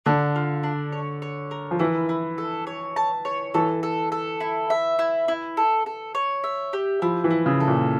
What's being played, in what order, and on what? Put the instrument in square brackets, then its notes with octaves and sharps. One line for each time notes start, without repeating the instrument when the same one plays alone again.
[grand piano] D3 [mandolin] D4
[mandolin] F4
D4
C#5
C#5
A#4
[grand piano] F3
[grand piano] E3 [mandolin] E4
[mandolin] E4
A4
C#5
A5
C#5
[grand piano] E3 [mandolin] A4
[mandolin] A4
A4
E4
E5
E4
E4
A4
A4
C#5
E5
G4
[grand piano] F3 [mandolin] E4
[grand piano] E3
[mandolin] E4
[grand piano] C#3
[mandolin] A4
[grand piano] A#2